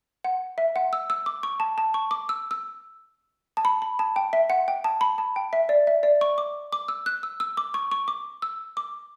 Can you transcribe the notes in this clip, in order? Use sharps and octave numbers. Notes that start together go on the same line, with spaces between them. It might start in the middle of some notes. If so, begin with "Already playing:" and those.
F#5
E5
F#5
E6
E6
D6
C#6
A5
A5
C#6
D6
E6
E6
A5
B5
B5
A5
G5
E5
F#5
G5
A5
B5
A5
G5
E5
D5
E5
D5
C#6
D6
D6
E6
F#6
E6
E6
D6
C#6
C#6
D6
E6
D6